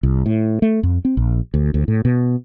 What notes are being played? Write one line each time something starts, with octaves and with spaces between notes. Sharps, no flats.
C2
A2
A3
F2
C4
A#1
D2
D2
A2
B2